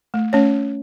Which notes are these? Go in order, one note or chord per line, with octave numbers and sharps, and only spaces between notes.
A3
A3 C#4 C#5